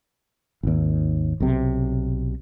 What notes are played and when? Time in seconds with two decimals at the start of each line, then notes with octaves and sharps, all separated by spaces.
0.63 G#1 D#2
1.40 B1 C3